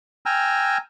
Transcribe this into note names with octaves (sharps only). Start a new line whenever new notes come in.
G5 G#5 A#5 E6 F6